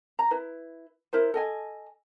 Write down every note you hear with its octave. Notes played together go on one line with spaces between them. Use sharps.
A#5
E4 B4
E4 A#4 C5
A4 D#5 G#5